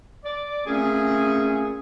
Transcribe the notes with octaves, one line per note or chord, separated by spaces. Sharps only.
D5
A#2 A3 C4 C#4 G#4